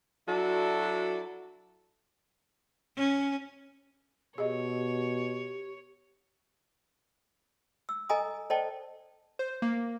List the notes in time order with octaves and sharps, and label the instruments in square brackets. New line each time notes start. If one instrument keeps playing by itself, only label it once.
[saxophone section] F#3 D4 E4 F#4 A4
[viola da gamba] C#4
[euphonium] B2 [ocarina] G4 [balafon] G#4 D#5 [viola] C#5
[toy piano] E6
A4 D#5 G#5 A#5 D#6
A4 C5 D5 D#5 G5 A5
[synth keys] C5
A#3